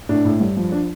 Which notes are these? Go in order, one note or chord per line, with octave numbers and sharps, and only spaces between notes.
A2 D4
A2
G2
F3
D4